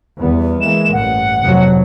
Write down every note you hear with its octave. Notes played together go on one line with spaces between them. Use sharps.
E2 G3 B3
E3 G#3 A#3 E7
A1 G2 F#5
F1 F#3